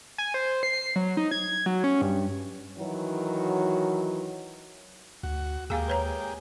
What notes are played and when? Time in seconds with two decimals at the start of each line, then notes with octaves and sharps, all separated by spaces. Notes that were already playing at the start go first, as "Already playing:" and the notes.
0.18 G#5
0.34 C5
0.63 C7
0.96 F#3
1.17 D#4
1.31 G#6
1.66 F#3
1.84 C#4
2.02 G2
2.78 D#3 E3 F#3
5.23 D2 F#4
5.70 D#2 G#3 A#3 G4 G#4 F5 G#5
5.88 B4 C#5 A#5